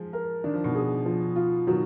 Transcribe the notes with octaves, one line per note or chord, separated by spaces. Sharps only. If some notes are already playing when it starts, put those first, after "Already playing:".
Already playing: F3 G#3
A#4
D#3 D4
F3
B2 D#3
G#4
F3
F4
B2 D#3 F#3